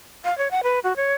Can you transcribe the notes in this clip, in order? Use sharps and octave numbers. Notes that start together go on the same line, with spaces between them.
F5
C#5
F#5
B4
F#4
C#5